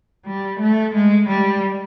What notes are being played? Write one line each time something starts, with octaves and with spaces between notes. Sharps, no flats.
G3
A3
G#3
G3